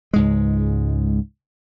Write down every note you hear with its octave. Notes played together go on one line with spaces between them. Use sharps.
C#2 G#2 G#3